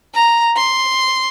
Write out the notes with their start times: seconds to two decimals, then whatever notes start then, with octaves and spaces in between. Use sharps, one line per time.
0.14 A#5
0.57 C6